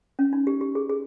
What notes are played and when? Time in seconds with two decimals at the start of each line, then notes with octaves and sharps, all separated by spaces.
0.19 C#4
0.33 D#4
0.47 G4
0.61 G4
0.75 G#4
0.89 G#4